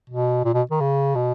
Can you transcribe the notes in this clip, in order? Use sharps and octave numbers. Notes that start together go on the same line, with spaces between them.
B2
A#2
B2
D#3
C#3
B2